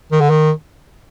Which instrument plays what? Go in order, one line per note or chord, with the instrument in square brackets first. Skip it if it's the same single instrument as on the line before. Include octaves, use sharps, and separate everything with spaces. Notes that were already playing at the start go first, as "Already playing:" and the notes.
[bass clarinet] D#3
D3
D#3